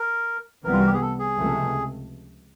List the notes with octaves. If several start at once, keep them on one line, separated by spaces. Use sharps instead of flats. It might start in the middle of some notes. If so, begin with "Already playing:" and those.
Already playing: A#4
C2 C3 E3 G3 B3 A#4
F4
F#4
G4
G#4
A4
G#4
C#2 C3 F3 A3